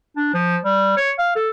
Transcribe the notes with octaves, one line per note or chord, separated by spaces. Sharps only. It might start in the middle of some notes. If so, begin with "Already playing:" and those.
D4
F3
G3
C#5
F5
A4